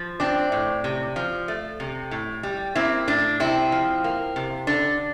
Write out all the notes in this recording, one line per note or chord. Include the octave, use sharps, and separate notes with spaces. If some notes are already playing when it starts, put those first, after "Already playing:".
Already playing: F3
C4 D4
A2
C3
F3
A3
C3
A2
G3
A#3 C4 E4
A2 D4
C3 C4 E4
F3
A#3
C3
D3 D4